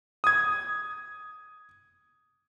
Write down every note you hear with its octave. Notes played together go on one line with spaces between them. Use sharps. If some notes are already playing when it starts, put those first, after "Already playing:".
D#6 G#6